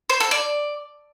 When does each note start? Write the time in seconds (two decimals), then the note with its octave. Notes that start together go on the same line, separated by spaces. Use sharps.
0.10 C5
0.20 A4
0.31 D5